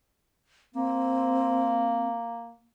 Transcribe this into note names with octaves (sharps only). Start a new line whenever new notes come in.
A#3 C4